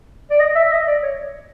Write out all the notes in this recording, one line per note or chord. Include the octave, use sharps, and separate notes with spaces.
D5
D#5
E5
E5
D#5
D5
C#5